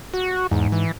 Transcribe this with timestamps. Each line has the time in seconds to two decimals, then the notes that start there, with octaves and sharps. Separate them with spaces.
0.14 F#4
0.51 E2 G#2
0.72 E3